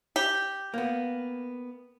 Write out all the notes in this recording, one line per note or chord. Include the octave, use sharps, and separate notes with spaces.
G4
A#3 B3